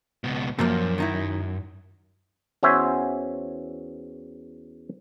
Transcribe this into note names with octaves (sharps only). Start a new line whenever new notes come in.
C#2 B2
F#2 A#2 F3 A#3
D#3 D#4 E4
E2 C#4 F#4 C5 E5 G#5